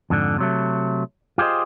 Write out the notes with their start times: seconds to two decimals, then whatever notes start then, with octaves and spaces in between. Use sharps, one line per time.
0.10 F2 G#2 D3
0.38 C3 F#3 A3
1.38 F4 G4 G#4 C5 D#5